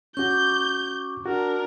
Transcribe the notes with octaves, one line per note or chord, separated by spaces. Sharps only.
C#4 F#4 C#6 D6 G6
D4 F#4 A#4